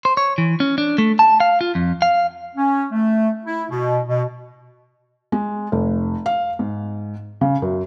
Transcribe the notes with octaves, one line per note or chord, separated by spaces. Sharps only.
C5
C#5
E3
C#4
D4
A3
A5
F5
F4
F2
F5
C#4
A3
E4
B2
B2
G#3
F1
F5
G#2
C#3
F#2